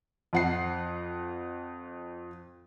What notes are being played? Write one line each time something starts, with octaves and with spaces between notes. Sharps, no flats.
F2 F#5 C7